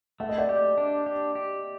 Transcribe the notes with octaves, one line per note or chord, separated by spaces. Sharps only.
A3 E5
D#5
D5 E5
G4
D4
G4
G4